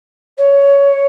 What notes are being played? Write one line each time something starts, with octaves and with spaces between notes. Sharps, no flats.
C#5